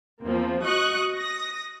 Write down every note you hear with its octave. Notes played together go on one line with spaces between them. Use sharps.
E2 F3 A#3 C4
F#4 D#5 C#6 D#6 F#6
D#6 A#6